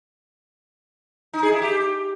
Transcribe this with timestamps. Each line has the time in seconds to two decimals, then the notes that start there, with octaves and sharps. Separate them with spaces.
1.33 D#4
1.43 G#4
1.52 E4
1.62 G4